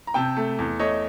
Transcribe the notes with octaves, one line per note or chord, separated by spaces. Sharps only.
A#5
C3 G5 A5
A3
E2
A3 C#5 D#5